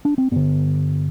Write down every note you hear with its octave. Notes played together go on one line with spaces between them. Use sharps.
D4
C4
G2 D3 B3